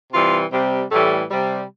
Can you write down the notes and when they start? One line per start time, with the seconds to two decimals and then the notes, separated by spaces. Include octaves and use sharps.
0.13 C3 E3 G3 F4
0.53 C3 G3
0.91 A2 E3 G3 A3
1.31 C3 G3